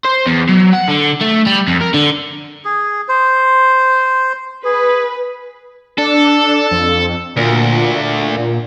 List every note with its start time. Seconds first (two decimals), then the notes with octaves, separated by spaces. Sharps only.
0.05 C5
0.27 E2
0.49 F#3
0.73 F#5
0.88 D3
1.21 A3
1.46 G3
1.68 F2
1.81 A#4
1.94 D3
2.65 G#4
3.09 C5
4.65 G#4 B4
5.98 D4 A4
6.71 F2
7.37 D2 A#2